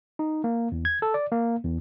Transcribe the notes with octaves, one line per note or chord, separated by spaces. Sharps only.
D#4
A#3
E2
G#6
A4
D5
A#3
E2